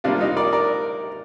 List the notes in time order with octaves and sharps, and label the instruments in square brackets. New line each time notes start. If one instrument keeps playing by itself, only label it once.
[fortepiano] C3 G3 A#3 D4 F4
D#4
A#4 D5
A#4 D5